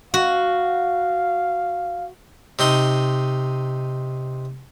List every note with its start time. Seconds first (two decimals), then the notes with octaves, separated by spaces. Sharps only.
0.14 F#4 F5
2.59 C3 D#4 C6